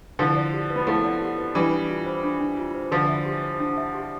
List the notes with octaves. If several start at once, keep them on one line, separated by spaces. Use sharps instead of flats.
D3 F3 E4
D5
G4
B4
B3
F3 A3 E4
D5
G4
B4
E3 G3 D4
D4
F4
C5
D4
D4
F4
C5
D3 F3 D4
E5
G4
C5
D4
E5
G4